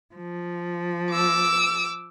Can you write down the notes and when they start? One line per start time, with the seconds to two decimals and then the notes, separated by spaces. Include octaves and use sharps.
0.14 F3
1.12 D6 E6